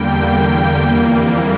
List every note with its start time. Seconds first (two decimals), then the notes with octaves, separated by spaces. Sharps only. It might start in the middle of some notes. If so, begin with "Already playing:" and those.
Already playing: E2 D3 G3 A#3 G5
0.19 G5
0.80 F2 E3 G3 A#3